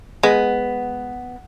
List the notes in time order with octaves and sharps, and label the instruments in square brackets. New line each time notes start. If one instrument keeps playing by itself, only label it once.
[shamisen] G#3 [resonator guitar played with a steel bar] B3